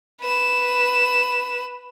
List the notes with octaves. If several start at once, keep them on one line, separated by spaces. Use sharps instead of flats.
B4 E7